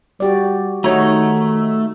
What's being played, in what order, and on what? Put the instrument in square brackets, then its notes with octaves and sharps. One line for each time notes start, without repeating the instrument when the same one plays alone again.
[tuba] G3 [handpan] F#4 G4 D5
[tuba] D#3 [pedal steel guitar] A3 [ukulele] D#4 C#5 A#5 [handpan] F#4